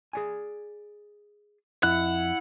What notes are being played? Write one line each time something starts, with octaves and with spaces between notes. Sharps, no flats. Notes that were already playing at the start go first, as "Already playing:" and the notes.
G#4 D5 G#5
F2 E4 F#5 F#6